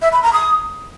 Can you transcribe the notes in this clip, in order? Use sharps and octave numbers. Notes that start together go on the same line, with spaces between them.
E5
B5
A#5
D#6